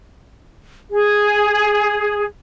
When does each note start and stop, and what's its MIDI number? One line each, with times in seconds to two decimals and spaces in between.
0.91 2.25 68